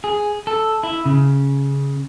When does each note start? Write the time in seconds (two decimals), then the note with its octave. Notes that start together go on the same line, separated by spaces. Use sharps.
0.04 G#4
0.47 A4
0.83 E4
1.06 C#3